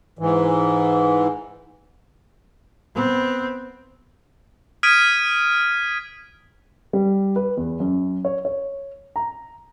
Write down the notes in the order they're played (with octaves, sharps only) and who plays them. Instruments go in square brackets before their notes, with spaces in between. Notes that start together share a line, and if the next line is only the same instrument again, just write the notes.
[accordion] G#2 E3
[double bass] B3 C4
[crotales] D#6 F6 G#6 B6 D7 D#7
[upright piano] G3
B4
E2
F#2
C#5
C#5
A#5